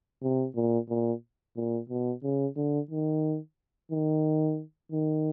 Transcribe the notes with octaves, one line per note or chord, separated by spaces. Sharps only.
C3
A#2
A#2
A#2
B2
C#3
D3
D#3
D#3
D#3